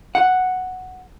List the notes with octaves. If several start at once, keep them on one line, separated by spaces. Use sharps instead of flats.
F#5